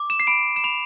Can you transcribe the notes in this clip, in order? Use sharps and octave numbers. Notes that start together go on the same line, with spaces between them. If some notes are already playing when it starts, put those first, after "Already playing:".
Already playing: D6
E7
C7
B5 D7
E7
B5 F7